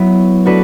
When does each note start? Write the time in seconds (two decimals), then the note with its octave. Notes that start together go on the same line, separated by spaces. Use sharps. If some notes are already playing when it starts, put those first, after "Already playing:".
Already playing: F#3 B3 E4 B4
0.46 A3 D4 F#4 B4